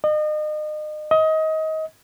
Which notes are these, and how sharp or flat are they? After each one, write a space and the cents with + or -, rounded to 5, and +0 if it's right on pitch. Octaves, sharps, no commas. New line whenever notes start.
D#5 -35
D#5 +25